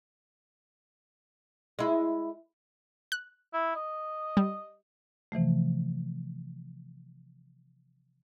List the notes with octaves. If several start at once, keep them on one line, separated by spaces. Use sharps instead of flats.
G#3 E4
F#6
E4
D#5
G3
C3 E3 F3 A3